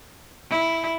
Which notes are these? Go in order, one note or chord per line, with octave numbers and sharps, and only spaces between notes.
E4